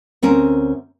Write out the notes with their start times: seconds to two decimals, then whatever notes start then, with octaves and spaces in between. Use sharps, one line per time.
0.22 D2 C4 C#4 A#4